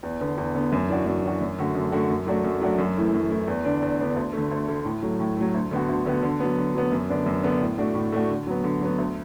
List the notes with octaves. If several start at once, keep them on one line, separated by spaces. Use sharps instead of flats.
E2
D3 B3
E2
D3 B3
F#2
E3 D4 F#4
F#2
E3 D4 F#4
F#2
D3 A3 F#4
F#2
D3 A3 F#4
F#2
F#3 A3 D4 F#4
F#2
F#3 A3 D4 F#4
F#2
E3 A3 E4
F#2
E3 A3 E4
E2
D3 B3 D4
E2
D3 B3 D4
D2
D3 A3
D2
D3 A3
A2
F#3 A3
A2
F#3 A3
D2
D3 B3 F#4
D2
D3 B3 F#4
D3
F#3 B3
D3
F#3 B3
F#2
D3 B3 D4
F#2
D3 B3 D4
A2
A3 D4 F#4
A2
A3 D4 F#4
D3
F#3 B3
D3
F#3 B3
D2